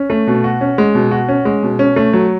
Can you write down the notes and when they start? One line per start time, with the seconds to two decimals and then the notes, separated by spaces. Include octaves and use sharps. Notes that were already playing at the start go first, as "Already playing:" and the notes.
Already playing: C#4
0.10 A3
0.27 B2
0.44 F#4
0.61 C#4
0.78 G#3
0.95 B2
1.11 F#4
1.29 C#4
1.45 G#3
1.63 B2
1.79 C#4
1.96 A3
2.13 F#3